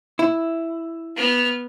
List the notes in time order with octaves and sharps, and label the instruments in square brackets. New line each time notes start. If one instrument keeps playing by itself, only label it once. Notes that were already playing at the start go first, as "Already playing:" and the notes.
[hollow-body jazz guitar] E4
[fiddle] B3 F6